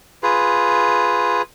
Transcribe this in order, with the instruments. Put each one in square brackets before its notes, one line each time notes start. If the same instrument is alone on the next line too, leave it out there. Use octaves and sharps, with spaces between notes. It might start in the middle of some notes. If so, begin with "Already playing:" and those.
[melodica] F4 G#4 B4